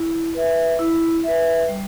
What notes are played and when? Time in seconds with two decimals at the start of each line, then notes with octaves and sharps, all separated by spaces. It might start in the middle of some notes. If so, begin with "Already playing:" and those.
Already playing: E4
0.34 B4 E5
0.79 E4
1.24 B4 E5
1.68 G3